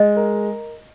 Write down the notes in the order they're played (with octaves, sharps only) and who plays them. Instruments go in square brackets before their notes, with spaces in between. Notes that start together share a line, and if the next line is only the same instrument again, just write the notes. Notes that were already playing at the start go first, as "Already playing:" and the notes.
Already playing: [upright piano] G#3 [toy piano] D#5
[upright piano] A#4